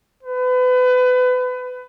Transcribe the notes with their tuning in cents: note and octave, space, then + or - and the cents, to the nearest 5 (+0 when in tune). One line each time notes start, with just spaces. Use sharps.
B4 +30